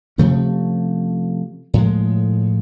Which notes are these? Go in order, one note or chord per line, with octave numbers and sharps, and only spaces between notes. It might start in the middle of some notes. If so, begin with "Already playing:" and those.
C3 F3 A3 C#4
A2 F3 G#3